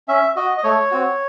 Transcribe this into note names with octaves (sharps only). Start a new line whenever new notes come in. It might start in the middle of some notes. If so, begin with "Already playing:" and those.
C#4 E5
F#4 D#5
D#5
A3 C#5
C4 F#4